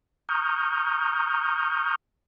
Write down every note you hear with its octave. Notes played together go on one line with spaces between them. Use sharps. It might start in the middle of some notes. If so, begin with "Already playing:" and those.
A#5 C#6 D#6 F6 G6